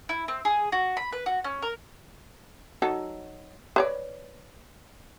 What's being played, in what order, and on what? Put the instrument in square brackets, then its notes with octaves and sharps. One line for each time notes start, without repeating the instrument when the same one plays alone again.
[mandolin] E4
C4
G#4
F#4
B5
B4
F#4
C#4
A#4
[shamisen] F#3 D#4 A4
B4 C#5 D5